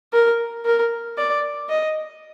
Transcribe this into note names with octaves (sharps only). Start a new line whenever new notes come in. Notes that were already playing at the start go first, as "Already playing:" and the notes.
A#4
A#4
D5
D#5